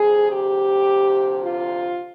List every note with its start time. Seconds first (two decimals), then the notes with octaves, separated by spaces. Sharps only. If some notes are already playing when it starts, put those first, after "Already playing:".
Already playing: D2 C3 F3 G#4
0.31 G4
1.43 F4